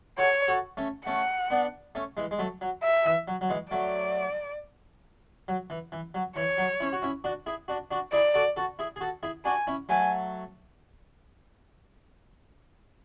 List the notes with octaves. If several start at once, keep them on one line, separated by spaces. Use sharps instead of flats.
F#4 A4 C#5
F#4 A4
A3 C#4
A3 C#4 F#5
B3 D4
A3 C#4
E3 G#3
G#3
F#3 A3
F#3
E5
E3
F#3
F#3
E3 G#3
F#3 A3 D5
F#3
E3
E3
F#3
E3 C#5
F#3
C#4 E4
F#4
C#4 E4
D4 F#4
E4 G#4
D4 F#4
D4 F#4
E4 G#4 D5
F#4 A4
F#4 A4
E4 G#4
G#4
F#4 A4
E4 G#4
D4 F#4 G#5
C#4 E4
F#3 A3 G#5